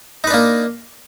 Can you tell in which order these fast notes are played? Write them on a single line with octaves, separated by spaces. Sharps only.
D#4 B4 D4 A#3